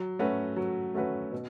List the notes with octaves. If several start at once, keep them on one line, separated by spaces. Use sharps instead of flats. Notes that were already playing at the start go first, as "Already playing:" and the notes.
Already playing: F#3
A3 C#4 F#4 B4
F#3
A3 C#4 F#4 B4
B2